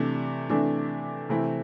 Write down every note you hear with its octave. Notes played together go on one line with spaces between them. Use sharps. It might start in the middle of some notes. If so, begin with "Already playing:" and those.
Already playing: C3 E3 A3 D4
C3 E3 A3 D4
C3 E3 A3 C4 E4